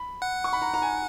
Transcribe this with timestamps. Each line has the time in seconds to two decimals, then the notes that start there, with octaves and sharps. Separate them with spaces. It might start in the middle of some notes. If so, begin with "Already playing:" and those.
Already playing: B5
0.22 F#5
0.44 C#6
0.53 B5
0.62 A#5
0.74 A#5
0.82 G#5